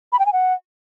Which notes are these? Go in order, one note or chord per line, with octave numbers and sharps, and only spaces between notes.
B5
G5
G#5
F#5